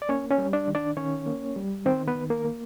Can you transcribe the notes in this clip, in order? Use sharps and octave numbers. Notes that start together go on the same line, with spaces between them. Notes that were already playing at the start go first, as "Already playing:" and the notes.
D5
A#3 C#4 C#5
C#4 C#5
G3
D4 D5
D#3
D4 D5
D#3 C#4 C#5
A#3
G3
D#3 C4 C5
B3 B4
D#3
A#3 A#4
A#3